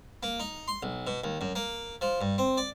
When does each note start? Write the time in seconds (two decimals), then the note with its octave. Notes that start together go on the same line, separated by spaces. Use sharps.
0.23 A#3
0.40 D#4
0.68 C6
0.83 B1
1.07 B2
1.24 D#2
1.41 F#2
1.56 A#3
2.01 F3
2.21 G2
2.38 C4
2.57 D5